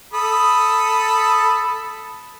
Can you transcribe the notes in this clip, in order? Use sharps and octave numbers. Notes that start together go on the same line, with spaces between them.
A4 B5 D#6